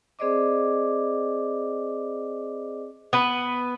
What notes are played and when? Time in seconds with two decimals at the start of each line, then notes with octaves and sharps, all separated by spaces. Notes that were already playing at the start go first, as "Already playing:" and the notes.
0.19 C4 G#4 C5 D5 D#5 D6
3.13 B3 B4